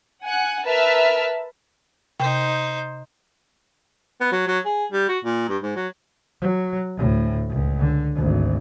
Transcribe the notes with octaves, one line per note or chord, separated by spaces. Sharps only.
F#5 G#5 F#6
A#4 B4 E5 A5 E6 F6
C3 D#4 C5 G5
B3
F#3
F#3
G#4
G3
F#4
A#2
G2
G#2
F#3
F#3
D2 A2
C#2
D3
G#1 D2